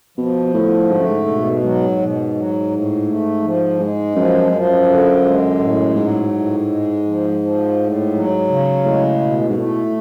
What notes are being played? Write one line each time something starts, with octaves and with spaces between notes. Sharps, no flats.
B2 F3
A2 D3
G#2 A3
F#2
G#2
B2
G#2 F#3
B2
F#3
A2
A3
F3
G#2 G#3
F#2 F3
F#2 F3
D3
G#3
A2
G#2 F#3
A2
G#3
F3
F3
A2
F#3
C#3
A2 G#3
B2
G#2
A2 A3